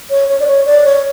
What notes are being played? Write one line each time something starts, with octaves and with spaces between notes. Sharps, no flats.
C#5
C#5
D5
C#5
D5
C#5